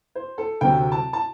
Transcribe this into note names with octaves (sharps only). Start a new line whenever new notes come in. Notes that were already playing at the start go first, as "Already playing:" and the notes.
C5
A4
D2 C3 F#3 C4 G5
A5
A5